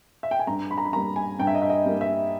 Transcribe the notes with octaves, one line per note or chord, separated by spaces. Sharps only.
E5
G5
G#5
G2 A#5
B5
A#5
B5
G3 A#3 A#5
G#5
G2 G5
E5
D#5
E5
D#5
G3 A#3
E5